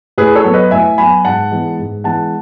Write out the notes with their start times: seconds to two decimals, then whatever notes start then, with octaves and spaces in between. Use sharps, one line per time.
0.18 A2 G#4 B4
0.36 A4 C#5
0.44 F#3 B3
0.54 B4 D#5
0.71 A2 E5 G#5
0.98 F#3 B3 G#5 B5
1.25 G#2 F#5 A5
1.52 E3 G#3 B3
1.79 G#2
2.04 E3 G#3 B3 F#5 A5